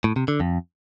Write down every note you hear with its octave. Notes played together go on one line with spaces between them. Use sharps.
A2
C3
D3
F2